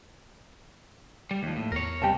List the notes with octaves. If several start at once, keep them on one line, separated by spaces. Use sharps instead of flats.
G3
D#2 F3
A2
E2 A#4 C#5
C3 G3 G4 D#5 A5